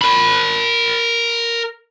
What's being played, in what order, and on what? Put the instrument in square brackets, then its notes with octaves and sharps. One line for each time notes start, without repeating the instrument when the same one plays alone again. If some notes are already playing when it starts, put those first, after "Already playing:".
[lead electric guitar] A#4 B5